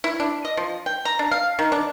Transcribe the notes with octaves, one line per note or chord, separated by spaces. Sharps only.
E4
D4
D#5
F3
G5
A#5
D4
F5
D#3
D4